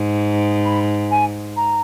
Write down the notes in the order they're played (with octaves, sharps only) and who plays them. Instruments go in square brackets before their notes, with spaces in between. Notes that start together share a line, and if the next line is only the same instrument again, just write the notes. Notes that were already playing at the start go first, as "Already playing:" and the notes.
Already playing: [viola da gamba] G#2
[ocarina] B5
G#5
A#5